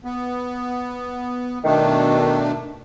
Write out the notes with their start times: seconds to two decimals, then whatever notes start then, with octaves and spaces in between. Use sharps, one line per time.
0.05 B3
1.64 B2 D#3 A3 D4